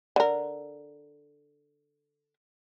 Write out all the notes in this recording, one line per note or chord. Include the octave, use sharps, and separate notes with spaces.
D3 A#4